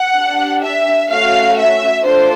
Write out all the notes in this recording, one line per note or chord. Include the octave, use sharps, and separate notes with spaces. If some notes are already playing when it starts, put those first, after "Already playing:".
Already playing: F#5
D4 G4
E5
A3 C#4 F#4 F5
E5
A3 D4 F4 A4 C5